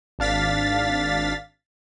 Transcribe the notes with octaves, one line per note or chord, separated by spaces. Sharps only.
G#1 D4 F5 A6 B6